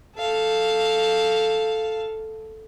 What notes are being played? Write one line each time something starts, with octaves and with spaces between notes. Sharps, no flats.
A4 F5